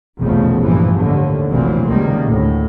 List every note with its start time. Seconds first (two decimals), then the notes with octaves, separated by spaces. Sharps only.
0.20 F1 B1 E2 C#3 F3 A3
0.60 E2 G2 A#2 E3 F3
0.96 D#2 A2 D3
1.50 F1 A#1 A#2 E3 F#3 C4
1.86 C#2 D#3 G3 A#3
2.25 D2 A2